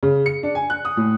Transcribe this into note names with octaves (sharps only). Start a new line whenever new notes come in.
C#3
C#7
D4
G#5
F#6
D#6
A2